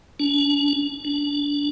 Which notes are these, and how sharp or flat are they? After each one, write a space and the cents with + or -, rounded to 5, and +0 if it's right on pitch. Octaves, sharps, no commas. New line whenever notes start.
D4 -45
D4 -25